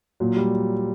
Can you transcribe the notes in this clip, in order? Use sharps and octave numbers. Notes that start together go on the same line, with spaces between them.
A#2 F#3
G3